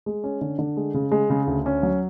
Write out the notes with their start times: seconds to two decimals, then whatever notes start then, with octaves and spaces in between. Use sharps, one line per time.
0.06 G#3
0.24 C#4
0.41 D3
0.59 D3
0.77 G#3
0.94 C#3
1.12 G#3
1.30 C#3
1.47 D2
1.66 C#4
1.83 F#3